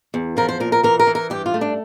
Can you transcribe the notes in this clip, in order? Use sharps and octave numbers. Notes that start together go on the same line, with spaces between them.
E2
F3 A#4
C5
A#2 A#4
A#4
E3 A#4
A#4
E3
A#4
G2 G4
F4
A3
D4